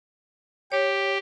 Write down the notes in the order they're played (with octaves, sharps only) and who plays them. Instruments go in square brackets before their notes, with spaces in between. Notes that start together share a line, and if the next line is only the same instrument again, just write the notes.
[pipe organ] G4 [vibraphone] C#5